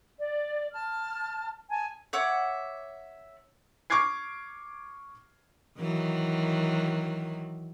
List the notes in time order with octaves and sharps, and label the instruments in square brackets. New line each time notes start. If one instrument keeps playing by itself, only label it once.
[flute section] D5
A5 F6
G#5 A5
[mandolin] C#5 E5 F#5 D6
[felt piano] C#6 D6 F6 G#6 C7
[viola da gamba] D#3 E3 F#3